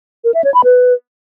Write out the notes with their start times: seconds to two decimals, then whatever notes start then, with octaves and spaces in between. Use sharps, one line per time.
0.24 A#4
0.34 E5
0.44 C#5
0.54 B5
0.64 B4